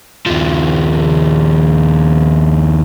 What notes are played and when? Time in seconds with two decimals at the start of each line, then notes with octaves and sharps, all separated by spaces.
0.26 D#2 F3